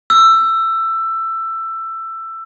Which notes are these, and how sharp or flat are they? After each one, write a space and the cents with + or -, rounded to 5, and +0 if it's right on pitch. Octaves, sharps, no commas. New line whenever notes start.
E6 +15